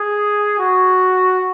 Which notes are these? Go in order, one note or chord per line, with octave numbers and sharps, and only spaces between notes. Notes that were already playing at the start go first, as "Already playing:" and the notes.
Already playing: G#4
F#4